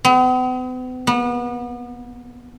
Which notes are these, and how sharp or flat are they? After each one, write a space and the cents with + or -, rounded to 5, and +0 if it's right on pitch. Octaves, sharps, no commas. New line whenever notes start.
B3 +45
B3 -30